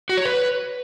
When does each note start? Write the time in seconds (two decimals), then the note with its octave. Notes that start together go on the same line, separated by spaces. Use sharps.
0.09 F#4
0.17 C#5
0.25 B4